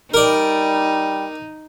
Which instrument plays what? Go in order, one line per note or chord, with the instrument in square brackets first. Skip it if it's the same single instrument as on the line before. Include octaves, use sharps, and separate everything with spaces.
[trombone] G3 [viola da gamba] D#4 [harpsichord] A#4 D5